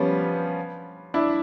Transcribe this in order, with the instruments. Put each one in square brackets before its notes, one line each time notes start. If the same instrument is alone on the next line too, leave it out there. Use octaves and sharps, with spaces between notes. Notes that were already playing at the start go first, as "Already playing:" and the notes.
Already playing: [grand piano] F3 G3 B3 C#4
D4 E4